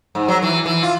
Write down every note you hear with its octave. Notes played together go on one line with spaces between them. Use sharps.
G#2
F#3
E3
E3
F4